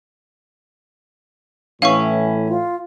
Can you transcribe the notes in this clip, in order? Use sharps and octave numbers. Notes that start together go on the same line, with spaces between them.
A2 E3 C#4 E4 F5 C#6
F4